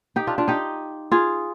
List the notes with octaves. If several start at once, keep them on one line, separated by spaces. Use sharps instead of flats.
D#4 G4
D4 F4
D4 F4
D#4 G4
F4 G#4